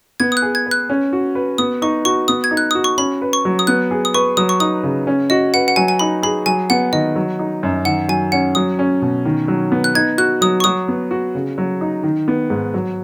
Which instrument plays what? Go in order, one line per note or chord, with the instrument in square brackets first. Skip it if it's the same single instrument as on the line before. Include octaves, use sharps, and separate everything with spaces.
[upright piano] B3 [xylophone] G#6
[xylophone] D#6
F#6
[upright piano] G#4
[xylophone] G#6
[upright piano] B4
[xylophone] F#6
[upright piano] C#4
F#4
B4
[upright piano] B3 [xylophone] D#6
[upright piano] D#4 [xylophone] C#6
[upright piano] F#4 [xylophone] C#6
[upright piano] B3 [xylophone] D#6
[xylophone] G#6
[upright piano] D#4
[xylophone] F#6
[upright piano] F#4 [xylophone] D#6
[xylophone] C#6
[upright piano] C#4 [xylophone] B5
[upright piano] B4
[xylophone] C#6
[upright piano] F#3
[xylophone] D#6
[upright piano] B3 [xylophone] F#6
[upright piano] G#4
[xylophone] D#6
[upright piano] B4 [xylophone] C#6
[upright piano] F#3 [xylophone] D#6
[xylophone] C#6
[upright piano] D#4 [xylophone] D#6
[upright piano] C#3
C#4
[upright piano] F#4 [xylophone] D#5
[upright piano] B4 [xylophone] F#5
[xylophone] F#5
[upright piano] F#3 [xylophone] G#5
[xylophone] G#5
[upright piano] D#4 [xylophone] B5
[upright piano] G#4 [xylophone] B5
[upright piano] F#3 [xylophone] G#5
[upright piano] B3 [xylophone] F#5
[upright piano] D#3 [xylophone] D#5
[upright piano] F#3
D#4
F#2
[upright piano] D#3 [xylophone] F#5
[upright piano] F#3 [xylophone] G#5
[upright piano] C#4 [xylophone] F#5
[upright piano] F#3 [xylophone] D#6
[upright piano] C#4
B2
D#3
F#3
B3
[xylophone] F#6
[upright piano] D#4 [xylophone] G#6
[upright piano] F#4 [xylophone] F#6
[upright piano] F#3 [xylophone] D#6
[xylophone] C#6
[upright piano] F#3 [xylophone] D#6
[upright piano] B3
F#4
C#3
F#3
D#4
D#3
B3
G#2
F#3